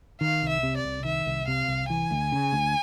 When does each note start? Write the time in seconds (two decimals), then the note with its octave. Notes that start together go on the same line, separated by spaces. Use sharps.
0.21 D#3 F5
0.42 C2
0.49 E5
0.63 C3
0.77 D5
0.85 C2
1.05 D#3 E5
1.26 C2
1.47 C3 F5
1.68 C2
1.89 E3 G#5
2.11 D2
2.32 C#3
2.52 D2